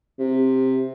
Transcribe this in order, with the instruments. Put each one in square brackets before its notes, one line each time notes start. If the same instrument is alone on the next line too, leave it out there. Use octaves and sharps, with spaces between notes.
[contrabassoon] C3